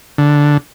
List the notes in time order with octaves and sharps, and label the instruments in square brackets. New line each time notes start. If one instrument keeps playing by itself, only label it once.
[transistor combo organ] D3